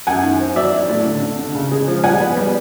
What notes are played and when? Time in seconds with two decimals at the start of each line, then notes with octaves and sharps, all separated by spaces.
0.07 F#2 F#5 G#5
0.23 D#3
0.40 C4
0.56 F#3 D5 E5
0.73 D4
0.89 A2
1.05 D3
1.22 D3
1.38 D3
1.55 C#3
1.71 G#3
1.87 F3
2.04 G3 F#5 G#5
2.20 B3
2.37 G3